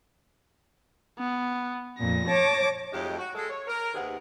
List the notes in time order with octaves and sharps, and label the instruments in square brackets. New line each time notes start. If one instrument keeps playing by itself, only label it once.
[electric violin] B3
[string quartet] F2 A#2 [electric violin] A#6
[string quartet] C#5 A5 D6
[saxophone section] F2 F#3 G#3 A3 D#4 G4
F#4
G#3 A4
C#5
A#4
D#2 C3 D#3 B3 G#4 F#5